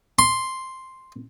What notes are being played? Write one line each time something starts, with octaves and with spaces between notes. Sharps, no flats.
C6